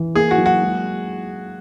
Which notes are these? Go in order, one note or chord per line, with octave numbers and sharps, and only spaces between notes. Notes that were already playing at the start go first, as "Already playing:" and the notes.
Already playing: E3
A#3 G#4
F#4
F#3
F#4
G#3